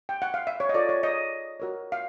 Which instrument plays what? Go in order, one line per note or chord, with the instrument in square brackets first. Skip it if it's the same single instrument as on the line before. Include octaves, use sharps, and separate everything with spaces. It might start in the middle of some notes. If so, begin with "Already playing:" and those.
[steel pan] G5
F#5
F5
E5
C#5
D#5
F4 A4 C5 D5
C#5
D#5
F#4 A#4 C#5
F5